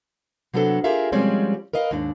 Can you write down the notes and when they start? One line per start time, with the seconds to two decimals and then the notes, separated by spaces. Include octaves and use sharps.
0.54 C3 F#3 B3 D4 A4
0.84 F4 G4 G#4 A#4 E5 F5
1.12 B2 F3 G3 G#3 C4 C#4
1.73 A#4 B4 D#5 F5
1.91 D#2 G#2 D4